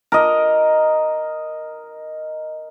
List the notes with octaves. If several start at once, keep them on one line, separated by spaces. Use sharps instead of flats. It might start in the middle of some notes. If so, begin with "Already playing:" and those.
A#4 D#5